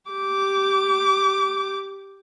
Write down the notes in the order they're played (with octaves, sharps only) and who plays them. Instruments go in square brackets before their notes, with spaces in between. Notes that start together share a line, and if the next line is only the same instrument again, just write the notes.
[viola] G4 D6